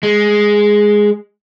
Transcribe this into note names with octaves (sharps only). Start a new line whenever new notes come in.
G#3